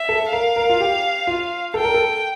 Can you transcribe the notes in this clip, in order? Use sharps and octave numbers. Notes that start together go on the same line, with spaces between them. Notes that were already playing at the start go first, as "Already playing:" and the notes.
Already playing: E5
A4
A#4 F5
A#4
F4
G4
F4
A4 G5
A#4
A4